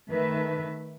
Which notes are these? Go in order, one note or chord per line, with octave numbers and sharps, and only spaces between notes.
D#3 A3 B4 E5